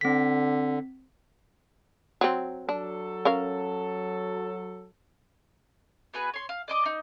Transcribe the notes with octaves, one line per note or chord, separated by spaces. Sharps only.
D3 C4 B6
F#3 C4
F#3 D4 A4
C#4 A#4 F5
B3 F#4 G#4 B4
C#5 C6
F5
D5 D#5 D6
D#4